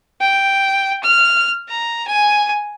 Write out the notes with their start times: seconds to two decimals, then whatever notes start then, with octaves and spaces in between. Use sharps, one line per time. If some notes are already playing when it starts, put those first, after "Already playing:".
0.21 G5
1.03 F6
1.69 A#5
2.07 G#5